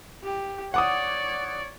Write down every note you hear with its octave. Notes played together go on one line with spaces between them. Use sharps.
G4
C#5 D5 F#5 D6 D#6